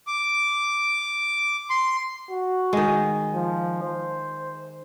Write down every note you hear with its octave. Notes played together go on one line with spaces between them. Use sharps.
D6
C6
F#4
D#3 G#3
F3
C5